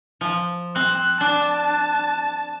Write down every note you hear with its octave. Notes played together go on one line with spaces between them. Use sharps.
F3
C4 F#6
D4 A5